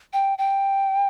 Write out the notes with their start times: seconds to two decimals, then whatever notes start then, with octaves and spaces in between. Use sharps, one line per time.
0.13 G5
0.38 G5